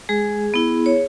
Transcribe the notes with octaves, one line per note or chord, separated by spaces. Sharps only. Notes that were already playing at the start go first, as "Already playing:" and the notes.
G#3 G#4
B3 E4
C#5